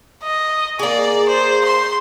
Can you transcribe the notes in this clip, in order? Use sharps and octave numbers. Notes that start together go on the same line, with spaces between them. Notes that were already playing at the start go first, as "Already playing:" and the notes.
D#5
A#3 G#4 D5
C5
C6